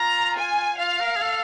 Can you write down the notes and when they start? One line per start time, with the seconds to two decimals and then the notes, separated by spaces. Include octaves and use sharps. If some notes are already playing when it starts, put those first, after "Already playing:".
Already playing: F4 A#5
0.36 G#5
0.79 F4 F5
1.00 A#4
1.16 G#4
1.22 A4